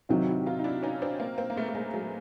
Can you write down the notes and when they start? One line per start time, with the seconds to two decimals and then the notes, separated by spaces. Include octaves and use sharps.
0.09 C3 D#3 F#3 F4 G4
0.27 E4 F#4
0.46 D#4 F4
0.59 D#4
0.64 D4 E4
0.83 C#4 D#4
1.02 C4 D4
1.20 A#3 C4
1.38 A#3 C4
1.50 A#3
1.56 A3 B3
1.69 A3
1.75 G#3 A#3
1.94 F#3 G#3